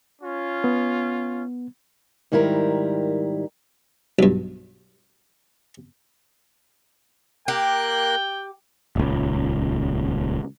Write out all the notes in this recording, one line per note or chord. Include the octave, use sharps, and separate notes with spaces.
C#4 F4
B3
G#2 D#3 G3 E4 A4 A#4
B1 G2
A#3 G4 A#4 G5 F#6
D#1 C#2